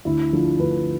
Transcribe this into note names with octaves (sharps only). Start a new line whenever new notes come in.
D2 E4
D3 F3
D2 B4